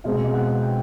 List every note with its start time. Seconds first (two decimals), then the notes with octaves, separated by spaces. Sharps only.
0.04 B2 G#3 C4 F5
0.34 F#5
0.63 G5